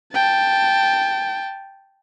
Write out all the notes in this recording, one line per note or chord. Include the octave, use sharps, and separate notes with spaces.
G5 A5